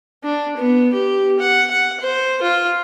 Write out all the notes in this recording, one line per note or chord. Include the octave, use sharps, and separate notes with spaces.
D4
B3
G4
F#5
F#5
C5
F4